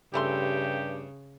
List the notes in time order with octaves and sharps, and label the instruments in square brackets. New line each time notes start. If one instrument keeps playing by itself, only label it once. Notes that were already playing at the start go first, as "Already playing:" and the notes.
[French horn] G2 [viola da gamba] C#3 [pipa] E3 A3 C6 [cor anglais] G4